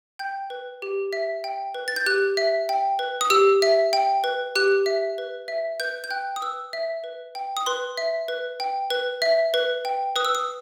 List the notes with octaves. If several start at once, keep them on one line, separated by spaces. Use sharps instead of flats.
G5 G6
B4
G4
E5
G5
B4
A6
G6
G4 F#6
E5
G5
B4
D#6
G4 E6
E5
G5
B4
G4 F#6
E5
B4
E5
B4 G6
G6
G5 F#6
D#6
B4 E6
E5
B4
G5
D#6
B4 C6
E5
B4
G5
B4
E5
B4
G5
B4 D#6
E6
D#6